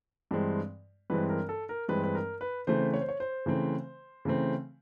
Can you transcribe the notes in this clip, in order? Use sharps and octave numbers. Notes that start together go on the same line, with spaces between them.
G2 E3 G#3 C4
G2 E3 G#3 C4 B4
A#4
A4
A#4
G2 E3 G#3 C4 B4
B4
A#4
B4
C#3 E3 A3 C4 C5
C#5
C5
C#5
C5
C#3 E3 A3 C4
C#3 E3 A3 C4